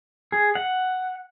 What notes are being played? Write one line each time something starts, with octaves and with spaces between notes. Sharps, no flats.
G#4
F#5